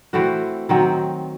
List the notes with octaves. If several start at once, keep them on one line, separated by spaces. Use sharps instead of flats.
E3 A3 C4 F#4
D#3 F#3 C4